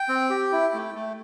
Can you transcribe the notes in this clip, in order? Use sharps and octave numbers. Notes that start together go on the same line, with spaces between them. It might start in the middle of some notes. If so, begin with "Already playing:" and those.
Already playing: G5
C4
G4
E4
A3
A3